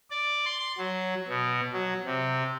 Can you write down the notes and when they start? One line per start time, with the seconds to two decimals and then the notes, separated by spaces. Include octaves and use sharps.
0.10 D5
0.46 C6
0.78 F#3
1.29 B2
1.73 F#3
2.05 C3